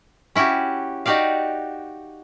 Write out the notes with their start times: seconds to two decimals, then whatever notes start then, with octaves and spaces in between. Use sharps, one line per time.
0.35 C#4 E4 F#4 G4
1.06 D#4 F#4 G4 D5 F5